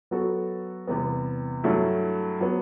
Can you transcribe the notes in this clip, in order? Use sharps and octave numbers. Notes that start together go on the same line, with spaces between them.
F#3 B3 F#4 A4
E2 C3 G3 B3
G2 F#3 A3 E4
F#3 B3